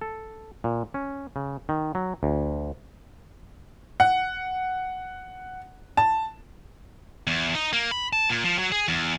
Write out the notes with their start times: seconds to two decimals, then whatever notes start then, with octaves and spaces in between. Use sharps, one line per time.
0.01 A4
0.64 A#2
0.94 C#4
1.36 C#3
1.69 D#3
1.95 F#3
2.23 D2
4.00 F#5
5.97 A5
7.27 E2
7.55 D#4
7.73 A#3
7.91 B5
8.13 A5
8.30 A#2
8.45 F3
8.59 F#3
8.72 G#4
8.88 E2